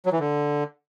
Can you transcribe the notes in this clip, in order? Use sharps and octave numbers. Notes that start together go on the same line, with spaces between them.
F#3
E3
D3